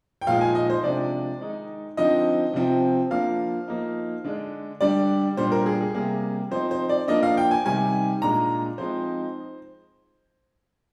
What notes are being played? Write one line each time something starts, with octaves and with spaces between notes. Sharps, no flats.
G5
A#2 F3 G#3 D#4 F5
G#5
D#5
C5
C3 F3 G#3 D4 D5
D#3 G#3 D#4
D3 F3 C4 D#4 D#5
C3 F3 C4
F3 A#3 D4 F5
F3 A#3 D#4
D3 G#3 D4
D3 G3 D4 D5
A#2 G3 D4 C5
A#4
G#4
G#4
C3 G3 A#3 G#4
F3 C4 D#4 C5
C5
D5
F3 A#3 D4 D#5
F5
G5
G#5
C3 D#3 G3 G#5
A#2 G#3 D4 A#5
F3 G#3 C4 D#4 C5